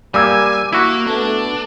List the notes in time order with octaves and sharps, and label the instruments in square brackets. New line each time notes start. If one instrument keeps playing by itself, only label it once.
[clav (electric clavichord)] G3 A#3 [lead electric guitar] G#5 [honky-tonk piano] D6 E6 G#6
[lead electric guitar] A#3 [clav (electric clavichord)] E4 F#4
[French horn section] A3 B3 A4 [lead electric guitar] D4